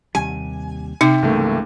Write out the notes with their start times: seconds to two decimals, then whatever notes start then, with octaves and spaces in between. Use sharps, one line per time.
0.15 D#2 C3 G3 G#5
1.01 C3 D#4
1.23 C#2 G#2 E3 G3 A3 A#3